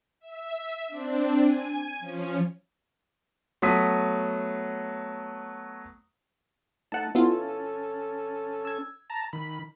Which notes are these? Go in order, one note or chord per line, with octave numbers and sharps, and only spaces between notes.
E5
C4 D4
G#5
F3 C#4
F#3 A3 B3 D#6 B6 D#7
A3 D#4 F#5 A5
B3 C#4 E4 F4 A4
E6 G#6
A5 A#5
D#3 B5